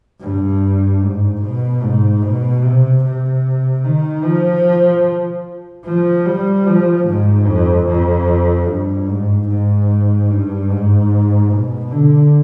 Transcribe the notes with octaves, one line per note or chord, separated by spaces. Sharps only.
G2
G#2
B2
G#2
B2
C3
C3
D#3
F3
F3
G3
F3
G#2
F2
F2
G2
G#2
G#2
G2
G#2
B2
D3